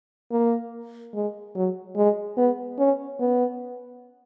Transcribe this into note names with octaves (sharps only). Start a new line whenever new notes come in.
A#3
G#3
F#3
G#3
B3
C#4
B3